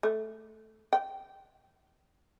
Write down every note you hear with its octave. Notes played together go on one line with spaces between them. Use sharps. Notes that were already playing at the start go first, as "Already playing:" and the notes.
A3
G5